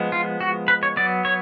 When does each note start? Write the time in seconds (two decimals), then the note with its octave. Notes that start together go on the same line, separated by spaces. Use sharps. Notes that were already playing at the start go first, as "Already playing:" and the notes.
Already playing: F3 G#3 B3
0.12 F4
0.41 F#4
0.68 B4
0.83 C#5
0.96 F#3 B3 D5
1.25 C#5